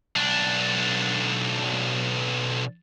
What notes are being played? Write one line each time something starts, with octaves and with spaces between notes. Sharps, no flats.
B1 D4